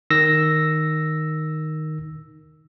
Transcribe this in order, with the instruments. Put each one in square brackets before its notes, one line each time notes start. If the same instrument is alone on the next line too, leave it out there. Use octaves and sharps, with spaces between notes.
[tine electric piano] D#3 E6 A#6